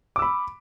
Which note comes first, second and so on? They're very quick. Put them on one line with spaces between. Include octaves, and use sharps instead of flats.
D6 E6 B5